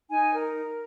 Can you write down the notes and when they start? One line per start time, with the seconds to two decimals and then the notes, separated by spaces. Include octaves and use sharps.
0.09 D#4 G#5
0.33 A#4